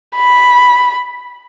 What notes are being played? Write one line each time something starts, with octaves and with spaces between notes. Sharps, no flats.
B5